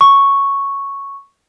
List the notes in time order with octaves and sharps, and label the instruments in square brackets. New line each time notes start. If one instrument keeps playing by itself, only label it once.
[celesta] C#6